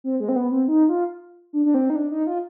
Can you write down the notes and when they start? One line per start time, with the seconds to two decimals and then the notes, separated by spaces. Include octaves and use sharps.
0.04 C4
0.20 G#3
0.29 C4
0.36 B3
0.51 C4
0.68 D#4
0.89 F4
1.53 D4
1.66 D4
1.74 C4
1.90 D#4
1.95 D4
2.11 D#4
2.27 F4